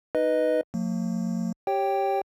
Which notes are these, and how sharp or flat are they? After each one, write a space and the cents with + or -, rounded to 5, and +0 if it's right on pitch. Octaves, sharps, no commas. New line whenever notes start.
D#4 +0 B4 +0 D#5 +0
F3 +45 A#3 -40
G4 +0 C#5 -5 G5 +0